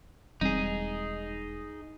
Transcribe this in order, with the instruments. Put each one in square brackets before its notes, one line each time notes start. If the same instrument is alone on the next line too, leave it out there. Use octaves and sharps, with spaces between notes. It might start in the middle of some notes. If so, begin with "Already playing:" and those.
[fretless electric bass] E1 G3 C4 [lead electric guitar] D#4 G#4